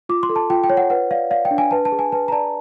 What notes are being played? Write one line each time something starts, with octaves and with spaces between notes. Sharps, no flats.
F4 D6
C6
A4
A5
F4 G5
G5
C#5
F#5
B4 F#5
D5 F5
D5 F5
G5
D4
G#5
B4 A5
A5
G#4
G#5
B4 A5
A#5
D5 A5